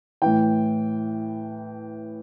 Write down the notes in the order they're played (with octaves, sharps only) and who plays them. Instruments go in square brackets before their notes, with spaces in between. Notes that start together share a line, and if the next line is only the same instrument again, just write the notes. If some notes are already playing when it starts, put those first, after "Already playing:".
[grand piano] A2 E3 G5